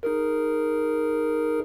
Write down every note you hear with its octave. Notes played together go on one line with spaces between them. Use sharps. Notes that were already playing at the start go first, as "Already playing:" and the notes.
D#4 G#4 A#4